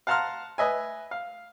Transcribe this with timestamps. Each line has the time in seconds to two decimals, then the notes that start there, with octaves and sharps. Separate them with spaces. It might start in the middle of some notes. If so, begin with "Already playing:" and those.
0.07 F5 F#5 A5 A#5 C6 F6
0.58 B4 D#5 E5 G#5
1.11 F5